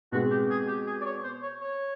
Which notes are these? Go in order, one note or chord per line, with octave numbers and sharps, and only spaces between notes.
B2 G#3 C4 F#4
G4
G#4
G4
G#4
D5
C#5
C5
C#5
C#5